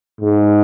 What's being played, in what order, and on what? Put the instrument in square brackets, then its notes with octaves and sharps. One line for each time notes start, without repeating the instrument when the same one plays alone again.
[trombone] G#2